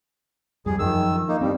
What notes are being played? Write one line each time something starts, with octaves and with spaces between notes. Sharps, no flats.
F2 G3 G#4
F#2 D#3 F3 E6
A#3 D#4
G2 G3 C4